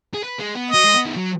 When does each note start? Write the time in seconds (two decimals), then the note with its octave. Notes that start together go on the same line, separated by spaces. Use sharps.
0.14 G#4
0.23 B4
0.39 G#3
0.55 B3
0.71 F#3 D#5
0.84 G#3
0.94 B3
1.06 D#3
1.17 F#3